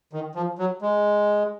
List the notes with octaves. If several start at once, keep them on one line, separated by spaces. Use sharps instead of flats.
D#3
F3
F#3
G#3